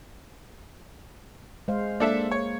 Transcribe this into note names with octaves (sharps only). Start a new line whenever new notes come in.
G#3 C5 F5
A#3 D4 A4 E5
C#5